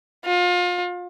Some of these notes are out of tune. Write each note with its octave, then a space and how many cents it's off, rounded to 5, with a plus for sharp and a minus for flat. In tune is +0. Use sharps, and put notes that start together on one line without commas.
F4 +30